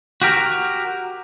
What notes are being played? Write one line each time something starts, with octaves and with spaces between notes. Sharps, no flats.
F#4 G4 A#4